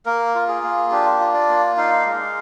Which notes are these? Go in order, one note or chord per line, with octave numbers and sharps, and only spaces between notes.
A#3 A#4
F4
G#4
A#3
D4 G4
F4
D5
A#3
D#4 F5
G#3